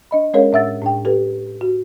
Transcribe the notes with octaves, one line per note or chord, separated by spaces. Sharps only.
D4 D#5 B5
G#3 C#4 G#4 A#4 C#5 F5
A2 D4 E5 F#5 E6 A6
A2 D4 G5
G4 A4 B4
F#4